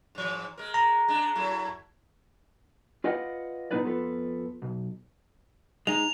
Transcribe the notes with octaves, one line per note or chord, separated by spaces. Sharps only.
G#2 E3
G#3 A#4
A#5
G#3 D4
F#3 A3 E4
F4 B4 D5 D#5 F5 F#5
A#2 B3 D#4 E4 B4 D5
F2 B3 F4 A4 B4
B1
G#3 D#4 F7